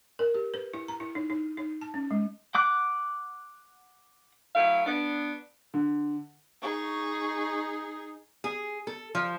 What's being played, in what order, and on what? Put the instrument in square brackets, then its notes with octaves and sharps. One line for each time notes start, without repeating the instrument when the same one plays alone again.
[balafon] A#4
G4
B4
E4
A#5
E4
D#4
D#4
D#4
A5
C#4
G#3
[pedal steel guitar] F#5 D6 F#6
[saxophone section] F#3 A3 E4 F5
B3 D4
[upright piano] D3
[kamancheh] D#4 G#4 [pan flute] C#6
[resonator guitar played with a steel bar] G#4
A4
F3